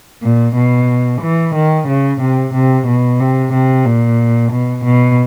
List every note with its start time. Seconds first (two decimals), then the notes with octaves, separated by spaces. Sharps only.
0.23 A#2
0.56 B2
1.22 E3
1.55 D#3
1.88 C#3
2.21 C3
2.54 C3
2.87 B2
3.20 C3
3.53 C3
3.86 A#2
4.52 B2
4.85 B2